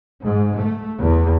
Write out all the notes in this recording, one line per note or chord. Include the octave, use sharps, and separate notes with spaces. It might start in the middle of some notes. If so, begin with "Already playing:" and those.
G#2
A3
E2